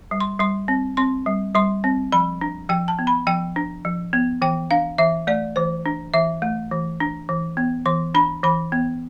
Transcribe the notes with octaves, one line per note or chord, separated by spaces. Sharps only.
G3
C6
G3 C6
C4
C4 C6
G3
G3 C6
C4
F3 B5
D4
F3 G5
A5
B3
B5
F3 G5
D4
F3
B3
E3 G5
D4 F5
E3 E5
A3 D5
E3 C5
D4
E3 E5
A3
E3
D4
E3
B3
E3 C6
D4 B5
E3 B5
B3